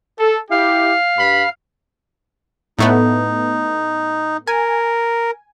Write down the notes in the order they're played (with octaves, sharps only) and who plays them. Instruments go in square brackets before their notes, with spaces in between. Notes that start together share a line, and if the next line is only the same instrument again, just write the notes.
[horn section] A4
[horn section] E4 G4 [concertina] F5
[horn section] G2 B5
[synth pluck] A2 A3 B3 [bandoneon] D#4
[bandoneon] A#4 [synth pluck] G#5